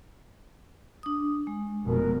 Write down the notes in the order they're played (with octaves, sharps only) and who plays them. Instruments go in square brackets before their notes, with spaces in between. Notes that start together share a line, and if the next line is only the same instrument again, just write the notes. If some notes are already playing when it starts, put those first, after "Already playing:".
[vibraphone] D4 D#6
G#3
[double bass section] F1 B2 [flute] A#4